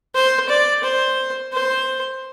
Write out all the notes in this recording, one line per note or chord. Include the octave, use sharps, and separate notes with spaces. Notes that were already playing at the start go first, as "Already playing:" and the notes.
C5
D5
C5
C5